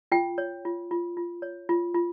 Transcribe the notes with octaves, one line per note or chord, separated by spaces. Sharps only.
F4 G5
C#5
F4
F4
F4
C#5
F4
F4